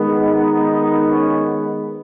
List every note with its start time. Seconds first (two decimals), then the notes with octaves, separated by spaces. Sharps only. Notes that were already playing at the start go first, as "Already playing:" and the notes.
Already playing: D#3 G#3 B3
0.28 D#4
1.08 C#4